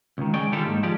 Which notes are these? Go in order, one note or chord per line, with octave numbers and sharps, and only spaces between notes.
C#2 D#3
G#3 C#4 D5 G5
D3 D#3 G3 F4 G4 A4
D#2 G#2 D#3
F3 G3 G#3 G4 D5